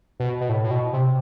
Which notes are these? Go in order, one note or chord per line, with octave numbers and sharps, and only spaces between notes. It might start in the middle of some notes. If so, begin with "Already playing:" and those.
B2
B2
A2
A2
B2
C3